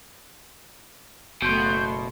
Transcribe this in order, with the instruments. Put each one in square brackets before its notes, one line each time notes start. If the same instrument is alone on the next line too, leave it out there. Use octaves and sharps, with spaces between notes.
[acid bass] F#1 [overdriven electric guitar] B2 [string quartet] A3 C6 [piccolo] G6